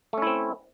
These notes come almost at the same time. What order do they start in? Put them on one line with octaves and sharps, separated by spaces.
A3 C#4 E4 C4